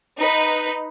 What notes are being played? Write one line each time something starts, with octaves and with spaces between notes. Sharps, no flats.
D#4 B4